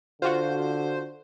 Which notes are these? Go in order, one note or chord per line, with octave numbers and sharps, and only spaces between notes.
D3 F4 F#4 C5